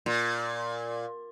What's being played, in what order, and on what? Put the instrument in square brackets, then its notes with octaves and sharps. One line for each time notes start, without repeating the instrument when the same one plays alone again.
[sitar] A#2